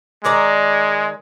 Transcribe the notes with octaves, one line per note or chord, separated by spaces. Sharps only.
D#3 G#3 D5 A#5